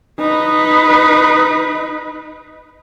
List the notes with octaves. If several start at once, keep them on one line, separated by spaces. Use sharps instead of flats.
D#4 B4